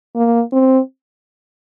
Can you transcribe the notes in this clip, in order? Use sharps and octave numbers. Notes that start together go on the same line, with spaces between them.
A#3
C4